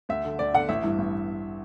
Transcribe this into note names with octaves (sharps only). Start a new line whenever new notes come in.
D2 E5
D3
D2 D5
D3 F#5
A1 E5
G2 E3
A1